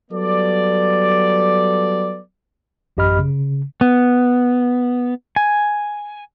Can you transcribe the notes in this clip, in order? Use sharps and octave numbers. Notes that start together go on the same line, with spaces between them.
F#3 G3 B3 A4 D5
A1 F#2 G4 D#5 B5 F6
C#3
B3
G#5